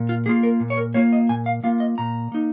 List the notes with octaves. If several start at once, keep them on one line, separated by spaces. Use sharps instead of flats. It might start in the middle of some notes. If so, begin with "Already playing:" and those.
Already playing: A#2
F4
A#3 F4 G#4
A#4
A#2
C#5
A#4
A#3 F4 C#5
D#5
A#2 G#5
F5
A#3 F4 F5
D#5
A#2 A#5
A#3 D#4